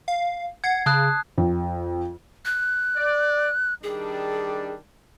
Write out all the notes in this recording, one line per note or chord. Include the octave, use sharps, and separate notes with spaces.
F5
F#5 G#6 C7
C#3 A5 D#6 F#6
F2
F#6
D5
D#3 G3 D4 G#4